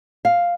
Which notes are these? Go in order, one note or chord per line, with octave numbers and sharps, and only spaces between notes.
F5